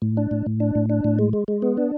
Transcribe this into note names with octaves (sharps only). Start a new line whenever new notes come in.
A2
D4
A2
A2
D4
A2
D4
A2
G#3
G#3
G#3
B3
D4